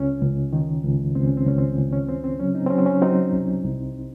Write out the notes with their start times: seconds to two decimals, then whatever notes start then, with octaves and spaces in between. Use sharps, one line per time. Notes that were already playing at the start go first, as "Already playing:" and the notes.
Already playing: C#2 C#4
0.21 C#2
0.53 D#3
0.84 C#2
1.15 C#2 C4
1.26 C#4
1.37 C4
1.46 C#2 C#4
1.58 C4
1.77 C#2
1.93 C#4
2.08 C#3 C4
2.24 C4
2.39 F#3 C#4
2.55 C4 D#4
2.66 C4
2.70 F#3 C#4
2.78 C4
2.86 C#4
3.02 F#3 C4 D#4
3.33 C2
3.65 C2